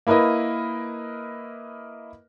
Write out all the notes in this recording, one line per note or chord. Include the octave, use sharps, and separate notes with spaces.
A#3 E4 A#4 B4 D#5